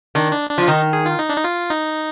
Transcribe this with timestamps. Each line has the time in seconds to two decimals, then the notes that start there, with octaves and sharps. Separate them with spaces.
0.15 D#3 D4
0.32 D4
0.50 D4
0.58 F3
0.62 F4
0.68 D#3 D#4
0.93 G#4
1.06 F4
1.19 D#4
1.29 D4
1.37 D#4
1.44 F4
1.70 D#4